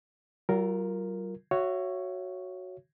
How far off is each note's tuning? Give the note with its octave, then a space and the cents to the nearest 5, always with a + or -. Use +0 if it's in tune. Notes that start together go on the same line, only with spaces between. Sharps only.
F#3 +45 F4 +0 A#4 +0
F#4 +0 C#5 +0 E5 +30